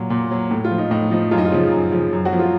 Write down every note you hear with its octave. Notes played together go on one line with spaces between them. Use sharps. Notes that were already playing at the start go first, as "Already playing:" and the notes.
Already playing: A#2 F#3
A#2
F#3
A2
F4
F3
D#4
A2 D#4
F3 D#4
F#2 F4
D#4
F4
C#3 F3
F#2
C#3 F3
F#2
F#3 F#4
F3
F4